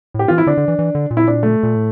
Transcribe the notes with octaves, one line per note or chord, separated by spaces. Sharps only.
A2 G4
E3 F4
E4
D3 D4
D3
E3
E3
D3
A#2
E4
D4
A3
A#2
A2